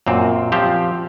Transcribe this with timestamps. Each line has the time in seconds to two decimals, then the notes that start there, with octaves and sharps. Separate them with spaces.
0.07 F#2 A#2 C4
0.52 F3 C4 G4